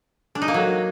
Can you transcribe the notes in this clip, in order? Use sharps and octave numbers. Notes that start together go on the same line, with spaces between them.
D4
D#4
A#3
F#3